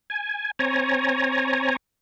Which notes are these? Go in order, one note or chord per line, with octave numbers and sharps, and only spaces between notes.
G#5
C4 C#5 G#5 A#5